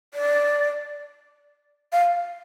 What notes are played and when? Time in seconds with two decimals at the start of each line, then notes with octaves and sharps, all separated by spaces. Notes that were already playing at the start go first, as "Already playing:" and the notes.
0.14 D5
1.92 F5